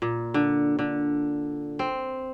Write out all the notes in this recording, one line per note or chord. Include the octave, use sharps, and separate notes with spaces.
A#2
D3
D3
C4